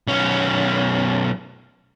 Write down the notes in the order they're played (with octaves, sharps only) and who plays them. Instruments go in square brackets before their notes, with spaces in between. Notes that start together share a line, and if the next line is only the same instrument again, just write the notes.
[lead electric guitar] B1 C#4